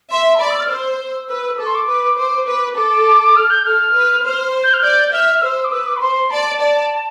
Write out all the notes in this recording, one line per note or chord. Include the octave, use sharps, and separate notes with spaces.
E5 C6
A5
D5 B5
E6
F6
C5 E6
B4
A4 D6
C6
D6
B4
C5 D6
B4
A4 D6
F6
G6
A4 F6
B4
C5
G6
F6
D5 G6
E5 F6
C5 E6
D6
B4 E6
D6
B5
C5 C6
D5 A5
D5